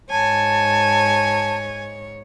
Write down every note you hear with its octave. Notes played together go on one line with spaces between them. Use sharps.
G#2 C#5 G#5 A5